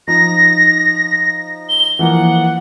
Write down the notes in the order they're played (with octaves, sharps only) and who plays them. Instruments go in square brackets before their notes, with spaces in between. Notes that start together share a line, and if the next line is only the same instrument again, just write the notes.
[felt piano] F3 D#4 [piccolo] A#6
[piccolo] G7
[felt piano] E3 F3 A#3 [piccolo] F#5